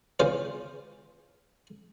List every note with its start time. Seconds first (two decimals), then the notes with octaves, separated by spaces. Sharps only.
0.19 C#2 C#3 E3 F4 C5 F5